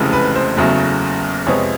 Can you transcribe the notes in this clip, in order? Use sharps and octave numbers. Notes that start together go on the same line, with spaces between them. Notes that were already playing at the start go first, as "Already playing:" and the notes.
Already playing: F1 F2 C#3 E3 G#3
B4
C5
F#1 E2 C#3 F#3 A3
F2 C3 F3 G#3 B3 C#5